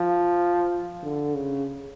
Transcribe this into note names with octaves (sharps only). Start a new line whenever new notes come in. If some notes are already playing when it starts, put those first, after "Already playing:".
Already playing: F3
D3
C#3